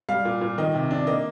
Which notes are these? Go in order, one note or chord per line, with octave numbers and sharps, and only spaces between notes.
G3 F5
A#2
A#2
D#3 D#5
C3
D4
A#3 D#5